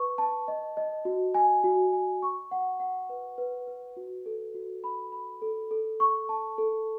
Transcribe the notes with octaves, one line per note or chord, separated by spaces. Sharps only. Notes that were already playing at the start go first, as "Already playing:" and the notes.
Already playing: B4 C#6
A5
D#5
D#5
F#4
G#5
F#4
G#5
C#6
F#5
F#5
B4
B4
B4
F#4
A4
F#4
B5
B5
A4
A4
C#6
A5
A4